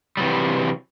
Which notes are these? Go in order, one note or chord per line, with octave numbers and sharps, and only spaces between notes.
C3 E3 F#3 G3